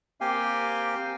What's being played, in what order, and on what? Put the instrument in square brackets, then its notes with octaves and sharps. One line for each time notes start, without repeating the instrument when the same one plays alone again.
[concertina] A#3 C4 G4 F5 G5 G#5